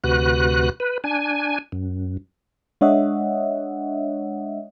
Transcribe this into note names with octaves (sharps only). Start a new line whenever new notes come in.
D2 C3 F#4 B4 F#6
B4
D4 G#5
F#2
G#3 D4 C#5 D#5 E5 F#5